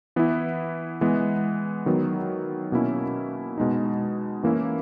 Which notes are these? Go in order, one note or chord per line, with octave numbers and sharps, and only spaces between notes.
E3 B3 E4
E3 G#3 B3
D#3 F#3 B3
B2 A#3 C#4 E4
B2 G#3 D#4
E3 A#3 C#4 E4